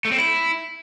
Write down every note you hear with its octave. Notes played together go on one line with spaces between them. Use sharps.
A3
C4
E4